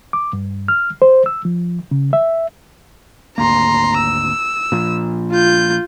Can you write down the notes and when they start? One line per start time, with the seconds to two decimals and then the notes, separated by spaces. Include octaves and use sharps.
0.13 D6
0.33 G2
0.68 F6
1.02 C5
1.26 E6
1.45 F3
1.91 C#3
2.13 E5
3.38 G#1 D2 A#3 A#5 C6
3.98 E6
4.72 A#2 F3
5.31 F4 G6